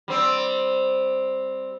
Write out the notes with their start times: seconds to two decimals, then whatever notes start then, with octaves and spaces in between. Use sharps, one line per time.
0.08 G3 C4